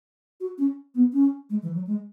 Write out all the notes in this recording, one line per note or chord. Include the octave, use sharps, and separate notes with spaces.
F#4
C#4
B3
C#4
G#3
E3
F#3
G#3